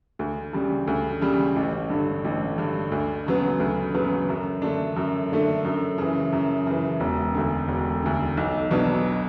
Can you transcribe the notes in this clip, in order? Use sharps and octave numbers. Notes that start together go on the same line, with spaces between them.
D2
C#3 G3
D2
C#3 G3
A1
G2 D3
A1
G2 D3
D2
C#3 F#3 B3
D2
C#3 F#3 B3
F#2
D3 A3 D4
F#2
D3 A3 D4
F#2
C#3 E3
F#2
C#3 E3
E1
D2 D3
E1
D2 D3
B1
B2 F#3 B3 D4